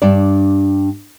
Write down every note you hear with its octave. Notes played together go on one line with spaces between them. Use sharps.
G2 D4 D5